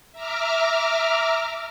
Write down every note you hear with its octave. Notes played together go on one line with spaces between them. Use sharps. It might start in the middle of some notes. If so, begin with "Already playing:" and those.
E5 A#5 D6 F6